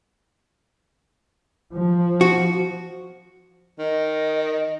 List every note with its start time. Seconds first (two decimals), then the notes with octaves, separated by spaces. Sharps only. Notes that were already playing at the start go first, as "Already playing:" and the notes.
1.74 F3
2.21 F#4
3.79 D#3 D#5